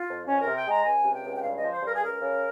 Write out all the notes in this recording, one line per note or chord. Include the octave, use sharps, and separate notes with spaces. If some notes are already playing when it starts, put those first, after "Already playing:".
Already playing: F4
F2
F2 C#4
C3 A#4
G5
G#3 A#5
C#2 G#5
C3
G5
C#2
G5
G2 F5
F3 D#5
C5
G2 A#4
G#4
C#2 A#4
C#3